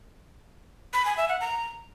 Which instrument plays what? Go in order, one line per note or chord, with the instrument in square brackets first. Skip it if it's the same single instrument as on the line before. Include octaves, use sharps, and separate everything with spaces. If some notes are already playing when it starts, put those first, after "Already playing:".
[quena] B5
G#5
E5
F#5
A#5